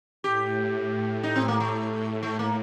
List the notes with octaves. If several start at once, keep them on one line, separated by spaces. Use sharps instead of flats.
A2 G4
D#4
C4
A#3
A3
A2
A3
A#3